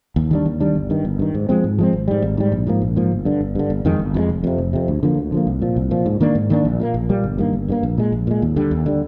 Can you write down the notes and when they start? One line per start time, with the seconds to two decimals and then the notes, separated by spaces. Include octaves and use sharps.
0.16 D#2
0.31 D#3 G3 D4
0.45 D#2
0.60 D#3 G3 D4
0.75 G1
0.90 G2 D#3
1.05 G1
1.19 G2 D#3
1.34 G#2
1.49 F3 G#3 C4
1.64 G#2
1.79 F3 G#3 C4
1.93 G#1
2.08 G#2 G3
2.22 G#1
2.37 G#2 G3
2.52 A#1
2.67 G#2 F3 A#3
2.82 A#1
2.96 G#2 F3 A#3
3.11 G1
3.25 G2 D3
3.41 G1
3.55 G2 D3
3.70 G1
3.85 F2 D#3 G#3
3.99 G1
4.14 F2 D#3 G#3
4.29 F1
4.44 F2 C3
4.58 F1
4.73 F2 C3
4.88 D2
5.03 D3 F3 A#3
5.18 D2
5.32 D3 F3 A#3
5.47 C2
5.62 A#2 F3
5.76 C2
5.91 A#2 F3
6.06 G#2
6.21 D#3 A#3 D4
6.35 G#2
6.50 D#3 A#3 D4
6.65 A#1
6.80 A#2 G3 A#3
6.94 A#1
7.09 A#2 G3 A#3
7.24 G1
7.38 G2 D#3 A#3
7.53 G1
7.68 G2 D#3 A#3
7.83 A#1
7.98 A#2 G#3
8.12 A#1
8.27 A#2 G#3
8.42 D#2
8.56 D3 G3
8.71 D#2
8.86 D3 G3